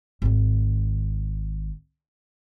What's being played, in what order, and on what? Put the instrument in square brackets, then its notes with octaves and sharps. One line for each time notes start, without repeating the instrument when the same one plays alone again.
[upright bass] G#1 D#3